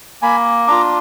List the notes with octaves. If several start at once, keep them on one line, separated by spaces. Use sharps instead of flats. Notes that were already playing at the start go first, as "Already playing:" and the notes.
A#3 G#5 B5
D4 F4 A#5 D6